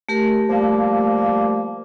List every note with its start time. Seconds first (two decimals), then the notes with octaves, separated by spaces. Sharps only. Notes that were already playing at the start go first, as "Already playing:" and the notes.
0.09 A3 G4 A#4
0.49 F3 G3 A#3